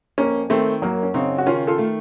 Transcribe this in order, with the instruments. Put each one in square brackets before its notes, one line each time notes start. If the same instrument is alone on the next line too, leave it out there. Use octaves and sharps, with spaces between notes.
[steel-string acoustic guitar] F2 [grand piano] A#3 C#4
[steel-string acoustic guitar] D#3 [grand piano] A3 C4
[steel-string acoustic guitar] F#2 [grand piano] F#3 A#3
[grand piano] C#4
[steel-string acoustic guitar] C#3 [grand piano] C4 D#4
[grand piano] F#4
[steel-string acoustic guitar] D#3 [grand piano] C#4 F4
[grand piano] F4 A4
[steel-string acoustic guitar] A3